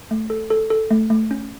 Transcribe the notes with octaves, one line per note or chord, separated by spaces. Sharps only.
A3
A4
A4
A4
A3
A3
C#4